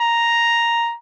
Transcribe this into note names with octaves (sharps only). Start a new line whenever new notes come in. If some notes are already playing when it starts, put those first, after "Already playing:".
A#5